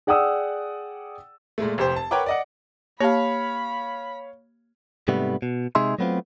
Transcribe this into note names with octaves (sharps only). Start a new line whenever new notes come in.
G#4 D5 F#5 G5 D#6 E6
A#2 G#3 A3
F1 G4 C5
A5
A#4 B4 C#5 F#5 G5 D6
D5 D#5 F#5
A#3 G4 C#5 F5 A5 B5
G#2 C3 G3 A3 B3
B2
C3 G#3 D#4 G#4 E5 C6
F#3 A3 B3 C4 F4